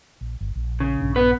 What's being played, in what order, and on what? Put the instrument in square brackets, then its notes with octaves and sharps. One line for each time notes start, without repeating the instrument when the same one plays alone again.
[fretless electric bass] A#1
G1
A#1
[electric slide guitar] C#3
[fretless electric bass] A#1 G2 D4
[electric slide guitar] B3 B4